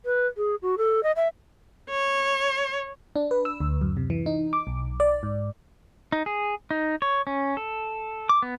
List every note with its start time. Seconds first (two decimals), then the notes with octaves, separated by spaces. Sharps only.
0.05 B4
0.37 G#4
0.62 F#4
0.78 A4
1.03 D#5
1.16 E5
1.90 C#5
3.16 D4
3.31 B4
3.45 E6
3.60 D2
3.81 F#2
3.97 C3
4.10 E3
4.26 D#4
4.53 D6
4.67 B1
5.00 D5
5.23 G#2
6.12 D#4
6.26 G#4
6.71 D#4
7.02 C#5
7.27 C#4
7.57 A4
8.29 D6
8.42 B3